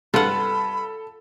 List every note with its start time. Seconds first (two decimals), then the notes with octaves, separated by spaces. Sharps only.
0.14 G2 C3 F4 A4 B4 F#5 B5